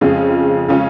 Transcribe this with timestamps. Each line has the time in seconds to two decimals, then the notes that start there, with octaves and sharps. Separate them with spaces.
0.01 F2 C#3 G#3 C#4 F4
0.68 C#3 G#3 C#4 F4